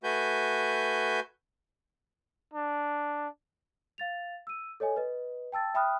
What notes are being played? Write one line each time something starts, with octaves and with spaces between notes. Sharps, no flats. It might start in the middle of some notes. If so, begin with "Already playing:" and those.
A3 F#4 B4 G#5 G6
D4
F5 A6 F7
E6 D#7
A4 C#5 D#5 G#5
B4 D#5
G5 A5 E6 A6
E5 G5 B5 D#6 F6 F#6